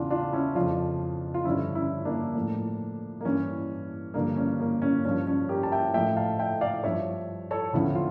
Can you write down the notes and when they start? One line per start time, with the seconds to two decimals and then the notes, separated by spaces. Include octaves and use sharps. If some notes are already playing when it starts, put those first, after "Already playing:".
Already playing: E2 C#3 E3 D4 F4
0.10 D4 F4
0.33 C#4 E4
0.55 F2 C#3 F3 D4 F4
1.34 F4
1.45 G2 D3 F3 C#4 E4
1.75 C#4 E4
2.05 A#3 D4
2.35 A2 F3
3.21 A#3
3.25 G2 E3 C#4
4.14 G2 D3 F3 A#3
4.36 C#4
4.60 A#3
4.82 C#4
5.05 G2 F3 C#4
5.27 C#4
5.49 G4 A#4
5.63 A5
5.72 E5 G5
5.94 A2 F3 E5 G5
6.17 F5 A5
6.39 E5 G5
6.61 D5 F5
6.84 G2 F3 C#5 E5
7.51 A4 C#5
7.73 E2 D3 F3 C#4 E4
7.95 F4